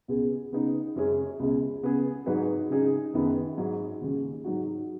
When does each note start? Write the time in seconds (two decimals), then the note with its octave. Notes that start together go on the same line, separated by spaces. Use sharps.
0.08 C#2 B2 G#3 B3 G#4
0.52 C#3 B3 D#4
0.96 F#2 C#3 G#3 C#4 G#4
1.39 C#2 B2 G#3
1.82 C#3 B3 G#4
2.26 G#2 F#3 D#4 B4
2.70 C#3 G#3 D#4 G#4
3.14 F#2 D#3 B3 G#4 B4
3.58 G#2 F#3 D#4
4.01 D#2 C#3 G#3
4.44 G#2 F#3 D#4 F#4